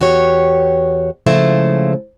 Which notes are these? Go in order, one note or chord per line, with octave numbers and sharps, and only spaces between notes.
E2 F#4 G4 C#5
C#3 F3 G#3 A3 E4 C5